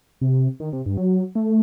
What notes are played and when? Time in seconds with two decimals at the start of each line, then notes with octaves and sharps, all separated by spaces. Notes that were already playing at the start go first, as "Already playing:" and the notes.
0.21 C3
0.60 D#3
0.73 C3
0.86 G2
0.97 F#3
1.35 A3